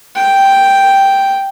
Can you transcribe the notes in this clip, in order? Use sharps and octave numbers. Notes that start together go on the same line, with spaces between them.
G5